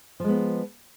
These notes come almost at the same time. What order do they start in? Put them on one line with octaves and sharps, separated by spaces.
F3 G#3 B3